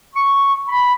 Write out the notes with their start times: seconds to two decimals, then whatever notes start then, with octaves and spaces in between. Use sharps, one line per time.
0.15 C#6
0.67 B5